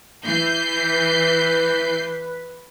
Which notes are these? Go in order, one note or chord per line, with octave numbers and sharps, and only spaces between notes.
E3 G6 C7
B4